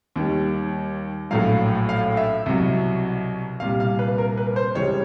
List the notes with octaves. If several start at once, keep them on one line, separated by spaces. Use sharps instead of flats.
D#2 D#3 G3
A#1 A2 F#3 F5
F5
E5
C2 B2 F#3
C2 A#2 G3 F5
F5
B4
A#4
B4
C5
C#2 C#3 E3 G3 C#5